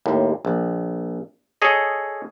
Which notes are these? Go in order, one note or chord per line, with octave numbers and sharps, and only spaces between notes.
D#2 A2
A#1
G#4 A4 C#5 D#5